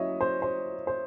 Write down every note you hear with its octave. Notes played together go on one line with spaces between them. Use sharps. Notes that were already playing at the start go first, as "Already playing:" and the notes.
Already playing: F#3 C#4 E4 C#5 D#5 E5
C5
C5
C5